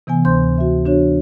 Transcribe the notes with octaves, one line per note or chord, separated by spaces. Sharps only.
C3 E3 B3 G#5
D2 C5 C6 G6
F#4 E5
E3 D4 F#4 C#5